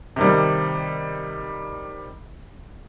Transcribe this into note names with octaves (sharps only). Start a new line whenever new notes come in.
C3 D#3 G3